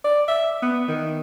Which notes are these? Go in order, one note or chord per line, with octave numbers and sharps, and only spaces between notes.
D5
E5
B3
D#3